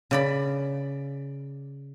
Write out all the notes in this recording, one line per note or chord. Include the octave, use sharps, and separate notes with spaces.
C#3 D5 B5